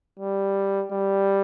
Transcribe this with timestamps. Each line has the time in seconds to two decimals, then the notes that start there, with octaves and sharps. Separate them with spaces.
0.19 G3
0.90 G3